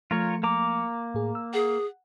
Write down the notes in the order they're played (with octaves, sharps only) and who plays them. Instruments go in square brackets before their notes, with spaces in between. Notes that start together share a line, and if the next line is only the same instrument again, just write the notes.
[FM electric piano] F3 A3 C#7 [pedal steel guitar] F4 A#4 C#5
[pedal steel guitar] A#3 A#5 D6
[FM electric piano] A2 G#4
E6
[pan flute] G#4 [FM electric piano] F#5